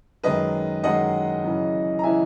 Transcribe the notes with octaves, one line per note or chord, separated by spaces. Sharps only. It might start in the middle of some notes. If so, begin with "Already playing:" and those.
F#2 D#3 G#3 B4 D#5
F#2 D#3 G#3 D#5 F#5
F#2 C#3 E3
A#5
C#3 E3 E5 G#5